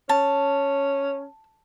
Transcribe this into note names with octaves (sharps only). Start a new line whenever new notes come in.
C#4 A5